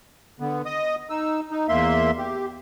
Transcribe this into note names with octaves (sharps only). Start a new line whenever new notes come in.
D3 B3
D#5 D#6
D#4 E6
D#4
E2 A#3 E5 C6
G4